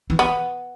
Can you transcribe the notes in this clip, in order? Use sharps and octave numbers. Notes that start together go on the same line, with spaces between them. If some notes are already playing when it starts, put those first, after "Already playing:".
E3
B3